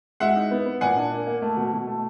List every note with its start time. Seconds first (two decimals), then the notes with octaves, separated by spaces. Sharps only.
0.20 G#3 E5 F#5
0.36 D#4
0.51 B3
0.66 B3
0.81 A#2 F#5 G#5
0.96 D4
1.11 A#3
1.27 A#3
1.42 A3
1.57 B2
1.72 B2
1.87 A3